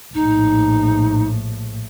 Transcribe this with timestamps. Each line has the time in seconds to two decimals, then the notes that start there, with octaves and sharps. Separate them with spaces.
0.14 A#1 A2 D#4